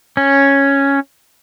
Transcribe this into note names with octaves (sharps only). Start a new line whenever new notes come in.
C#4